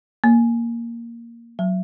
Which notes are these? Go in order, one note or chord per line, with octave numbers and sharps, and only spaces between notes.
A#3
F#3